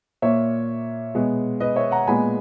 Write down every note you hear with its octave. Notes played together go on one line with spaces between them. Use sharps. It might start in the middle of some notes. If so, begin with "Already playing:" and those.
A#2 A#3 C#5 E5
B2 G#3 B3
B4 D#5
C#5 E5
F#5 A#5
A#2 G#3 B3 G#5 B5